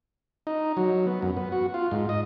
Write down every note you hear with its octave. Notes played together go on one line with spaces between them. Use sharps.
D#4
F#3
B3
F#2
B3
F#4
F4
G#2
D#5